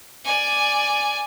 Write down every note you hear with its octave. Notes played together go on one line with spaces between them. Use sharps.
D5 G#5